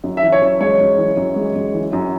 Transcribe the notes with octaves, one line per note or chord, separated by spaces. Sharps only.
F#2
E5
E3
C#5
F#2
G#3 C#5
F#2
E3
F#2
G#3
F#2
E3
F#2